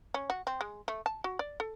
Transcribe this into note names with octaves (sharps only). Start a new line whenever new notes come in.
C#4
F#4
C4
G#3
A3
A5
F#4
D5
A4